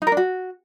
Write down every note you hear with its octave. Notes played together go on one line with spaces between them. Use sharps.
D#4
A#4
D4
F#4